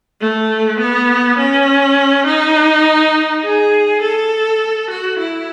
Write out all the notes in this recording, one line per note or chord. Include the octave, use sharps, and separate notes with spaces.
A3
B3
C#4
D#4
G#4
A4
F#4
E4